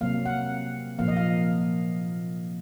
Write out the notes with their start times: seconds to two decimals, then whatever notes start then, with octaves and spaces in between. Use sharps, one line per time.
0.01 C3 F#3 A#3 F5
0.26 F#5
0.99 A#2 F3 A#3 F5
1.08 D#5
1.17 F5